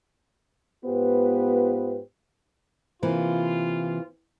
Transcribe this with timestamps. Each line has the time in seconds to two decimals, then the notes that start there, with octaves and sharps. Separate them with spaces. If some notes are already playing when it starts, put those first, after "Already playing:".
0.85 G#2 B3 F4 G4 B4 C5
3.02 C3 E3 A#3 F4